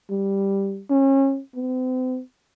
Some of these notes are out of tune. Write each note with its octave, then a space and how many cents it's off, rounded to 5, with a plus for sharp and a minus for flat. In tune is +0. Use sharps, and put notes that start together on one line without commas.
G3 +0
C#4 -30
C4 -40